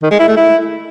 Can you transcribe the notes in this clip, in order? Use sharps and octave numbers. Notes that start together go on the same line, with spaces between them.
D#3
G#3
E4
A3
E4